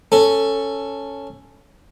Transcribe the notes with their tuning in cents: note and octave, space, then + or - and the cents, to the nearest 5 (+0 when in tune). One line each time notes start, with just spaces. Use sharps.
C#4 +0 A4 +10